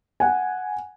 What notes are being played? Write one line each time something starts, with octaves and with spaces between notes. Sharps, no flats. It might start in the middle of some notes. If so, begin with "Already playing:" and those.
F#5 G#5